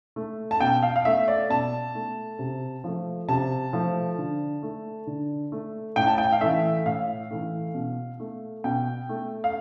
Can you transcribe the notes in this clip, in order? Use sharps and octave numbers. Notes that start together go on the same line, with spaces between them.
A3
A5
B2 G5
F5
F5
A3 E5
D5
B2 A5
A3
C3
F3 A3
C3 A5
F3 A3
D3
A3
D3
A3
A2 G5
A5
G5
F5
E3 A3 E5
A2 F5
E3 A3
B2
A3
B2 G5
A3
F5